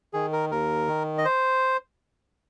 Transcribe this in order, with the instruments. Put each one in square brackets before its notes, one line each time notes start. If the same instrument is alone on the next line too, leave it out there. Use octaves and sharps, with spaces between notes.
[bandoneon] D#3 G#4
A#4
D#2 A#4
D#3
D#5
C5